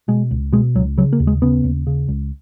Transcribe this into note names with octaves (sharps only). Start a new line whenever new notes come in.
B2 G#3
C#2
B2 G#3
C#2 F#3
C#3 F#3
A#3
D#2
G#3
C#3 B3
D#2
C#3
C#2